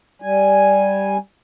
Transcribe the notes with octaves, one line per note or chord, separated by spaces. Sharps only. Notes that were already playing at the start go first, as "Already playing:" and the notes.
G3 G#5